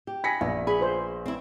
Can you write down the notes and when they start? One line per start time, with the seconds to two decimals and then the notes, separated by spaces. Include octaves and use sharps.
0.07 G4
0.24 G#5 B5 A#6 B6 C#7
0.41 A#1 B3 E5
0.67 G#4 B5
0.79 F4 B4 C5
1.26 C4 E4